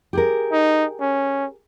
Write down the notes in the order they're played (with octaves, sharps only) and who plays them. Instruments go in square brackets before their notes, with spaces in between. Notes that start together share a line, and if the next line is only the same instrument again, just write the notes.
[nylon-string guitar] G4 G#4 A#4
[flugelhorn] D#4
C#4